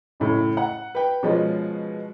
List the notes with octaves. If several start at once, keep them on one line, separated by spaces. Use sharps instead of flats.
F#2 A2 C#3
F#5
B4 G5
B2 F3 G#3 C#4